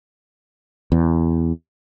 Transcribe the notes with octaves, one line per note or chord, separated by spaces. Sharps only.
E2